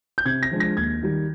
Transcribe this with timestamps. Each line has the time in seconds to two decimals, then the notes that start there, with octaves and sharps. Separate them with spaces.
0.18 G6
0.25 C3 G#6
0.43 A#6
0.51 F3 G#3 D4
0.60 A#6
0.77 D#2 G#6
1.03 D#3 G3